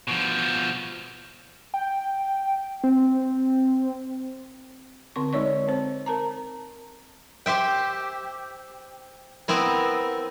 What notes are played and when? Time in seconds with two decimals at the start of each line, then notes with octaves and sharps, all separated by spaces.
0.08 B2 F3
1.74 G5
2.84 C4
5.16 D3 C4 C#6
5.33 G#3 D#4 C#5 D5 C#6
5.68 C4 C5
6.06 A#4 A5 A#5
7.46 G4 C5 E5 G5
9.48 B3 C4 E4 A#4